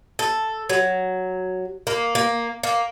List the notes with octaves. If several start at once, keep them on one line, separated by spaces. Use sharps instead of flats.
A4
F#3
A#3
A#3
A#3